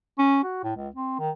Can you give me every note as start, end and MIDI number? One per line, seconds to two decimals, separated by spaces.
0.19 0.43 61
0.44 0.63 66
0.64 0.72 45
0.76 0.88 37
0.96 1.18 60
1.19 1.30 51